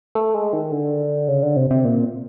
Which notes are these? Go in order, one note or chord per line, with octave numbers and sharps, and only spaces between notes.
A3
G#3
D#3
D3
C#3
D3
C3
C3
A#2